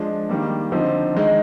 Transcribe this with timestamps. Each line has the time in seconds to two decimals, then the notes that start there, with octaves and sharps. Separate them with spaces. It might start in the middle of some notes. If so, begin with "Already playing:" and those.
Already playing: F3 G#3 D4
0.29 D#3 G3 A#3
0.72 D3 F3 C4 D#4
1.15 D#3 G#3 D#4